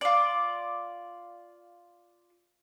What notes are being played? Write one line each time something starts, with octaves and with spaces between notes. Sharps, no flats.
F4 D5